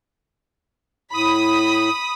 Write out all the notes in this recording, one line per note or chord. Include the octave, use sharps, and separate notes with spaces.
A2 B5 D#6